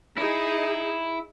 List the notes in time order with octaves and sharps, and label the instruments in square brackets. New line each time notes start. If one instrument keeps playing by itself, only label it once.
[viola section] D#4 G#4 [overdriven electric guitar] E4